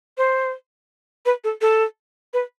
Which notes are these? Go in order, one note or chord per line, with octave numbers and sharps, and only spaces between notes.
C5
B4
A4
A4
B4